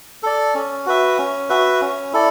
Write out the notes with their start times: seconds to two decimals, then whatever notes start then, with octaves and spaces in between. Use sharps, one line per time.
0.23 A4 D5
0.55 C#4
0.86 F#4 B4 E5
1.18 C#4
1.49 F#4 B4 E5
1.81 C#4
2.13 E4 A4 D5